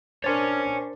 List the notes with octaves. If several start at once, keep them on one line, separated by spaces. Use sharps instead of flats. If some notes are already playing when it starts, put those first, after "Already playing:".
D4 A#4 C5 C#5 G#5 A6